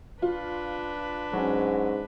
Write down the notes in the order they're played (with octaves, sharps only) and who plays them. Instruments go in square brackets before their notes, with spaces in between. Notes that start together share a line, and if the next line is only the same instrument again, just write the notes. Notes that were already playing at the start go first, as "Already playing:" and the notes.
[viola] D4 B4 [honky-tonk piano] F4
[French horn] G#2 [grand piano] F#3 C#4